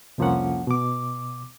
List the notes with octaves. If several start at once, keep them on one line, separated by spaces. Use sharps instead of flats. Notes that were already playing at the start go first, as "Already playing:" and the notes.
C2 F2 F3 A#3 C#4 F#5
B2 D6